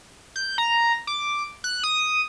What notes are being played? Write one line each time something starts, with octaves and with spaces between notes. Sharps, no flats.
G6
A#5
D6
F#6
D#6